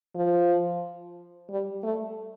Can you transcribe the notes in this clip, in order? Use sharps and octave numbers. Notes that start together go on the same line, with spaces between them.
F3
G3
A3